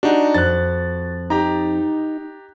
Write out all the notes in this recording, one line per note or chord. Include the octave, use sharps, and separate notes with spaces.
D4 D#4 F#4
F2 F#6 A6
D#4 G4 A#5